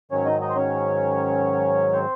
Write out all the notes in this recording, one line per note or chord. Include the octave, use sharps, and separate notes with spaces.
G#2 D#3 F#3 C#4 C#5
D#4 D#5
D#4 D#5
C5
C#4 C#5
C4 C5